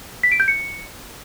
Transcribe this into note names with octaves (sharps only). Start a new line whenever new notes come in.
B6
D7
G6
C#7